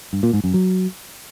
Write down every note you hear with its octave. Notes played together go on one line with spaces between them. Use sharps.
G2
A#2
G#2
F#2
F#3